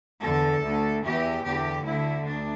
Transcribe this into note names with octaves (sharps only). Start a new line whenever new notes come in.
E2 D3 A4
D2 D3
E2 E3 G4
E2 D3 G4
D2 D3 E4
D2 D4